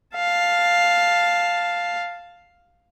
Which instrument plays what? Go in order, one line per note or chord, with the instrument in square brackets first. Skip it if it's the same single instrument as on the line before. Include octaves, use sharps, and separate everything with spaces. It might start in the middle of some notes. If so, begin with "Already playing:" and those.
[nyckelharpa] F5 A5